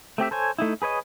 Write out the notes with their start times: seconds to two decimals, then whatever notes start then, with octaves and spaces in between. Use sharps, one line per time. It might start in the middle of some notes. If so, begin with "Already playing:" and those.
0.18 A3 C4 G4 E5
0.31 A4 C5 C#5 G#5
0.58 A3 D#4 E4
0.82 G#4 B4 C#5 D#5